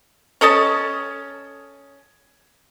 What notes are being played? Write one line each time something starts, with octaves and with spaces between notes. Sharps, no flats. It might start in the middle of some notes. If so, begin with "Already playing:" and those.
C#4 A4 D#5 A5